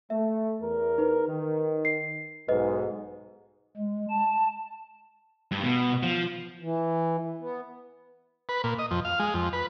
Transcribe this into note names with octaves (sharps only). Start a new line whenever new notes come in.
A3 E5
E2 A#4
D#4 B4
D#3
C7
B1 G#2 B4 D#5
G#3
A5
G2
B2
F3
E3
B3
B4
A#2
D#5
F2
F5
G#3
F2
B4